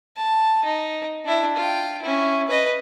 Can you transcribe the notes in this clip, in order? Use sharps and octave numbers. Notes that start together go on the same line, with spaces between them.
A5
D#4
D4 E4
F4 G5
C#4 E4
B4 D#5